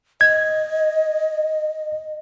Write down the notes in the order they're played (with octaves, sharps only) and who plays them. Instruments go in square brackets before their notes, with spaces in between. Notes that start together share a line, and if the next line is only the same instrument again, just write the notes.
[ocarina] D#5 [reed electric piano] G#6